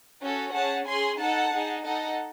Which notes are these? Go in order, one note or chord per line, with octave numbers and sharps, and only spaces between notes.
C#4 F#4 A4
C#4 G#4 F#5 A5
C#4 G#4 G#5 C6
D#4 A4 F#5 A5
D#4 G#4
D#4 A4 D#5 F#5